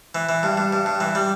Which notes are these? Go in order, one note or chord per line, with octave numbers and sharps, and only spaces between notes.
E3
E3
G2
G2
G2
G2
E3
G3